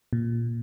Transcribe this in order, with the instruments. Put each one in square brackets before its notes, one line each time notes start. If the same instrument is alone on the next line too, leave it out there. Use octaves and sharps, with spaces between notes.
[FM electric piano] A#2